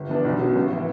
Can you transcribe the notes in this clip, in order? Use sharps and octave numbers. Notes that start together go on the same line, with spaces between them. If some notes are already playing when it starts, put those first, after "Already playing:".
Already playing: G1
G2 E3 B3 D4
B1
B2 F#3 C#4
A1
E3